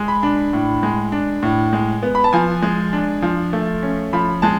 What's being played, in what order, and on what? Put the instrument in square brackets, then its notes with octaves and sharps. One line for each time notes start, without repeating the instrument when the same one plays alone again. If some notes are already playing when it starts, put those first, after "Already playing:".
Already playing: [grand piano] G#3
B5
D4
A2
G#3
D4
A2
G#3
B3
B5
A5
F3 G#5
G#3
D4
F3
A3
C#4
F3 B5
G#3 A5